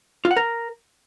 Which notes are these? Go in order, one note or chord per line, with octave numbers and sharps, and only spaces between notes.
F4
F#5
A#4